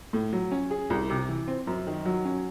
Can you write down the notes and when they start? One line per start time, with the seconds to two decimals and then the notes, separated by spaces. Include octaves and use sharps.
0.13 A2
0.33 F#3
0.51 C#4
0.71 G#4
0.90 C2
1.10 C3
1.29 E3
1.48 C4
1.67 F#2
1.87 D#3
2.06 F#3
2.25 C#4